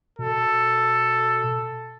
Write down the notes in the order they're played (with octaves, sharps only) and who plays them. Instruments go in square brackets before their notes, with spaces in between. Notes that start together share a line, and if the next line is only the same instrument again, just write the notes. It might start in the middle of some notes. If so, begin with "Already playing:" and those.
[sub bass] B2 [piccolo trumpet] A4